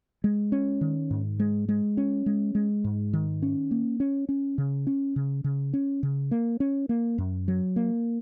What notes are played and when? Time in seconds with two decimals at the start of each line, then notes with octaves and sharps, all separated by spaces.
0.24 G#3
0.52 C#4
0.81 D#3
1.11 G#2
1.39 G#3
1.69 G#3
1.97 C#4
2.26 G#3
2.55 G#3
2.84 G#2
3.13 D#3
3.42 C#4
3.71 A#3
4.00 C#4
4.29 C#4
4.58 C#3
4.87 C#4
5.16 C#3
5.44 C#3
5.73 C#4
6.03 C#3
6.31 A#3
6.60 C#4
6.89 A#3
7.18 F#2
7.48 F#3
7.76 A#3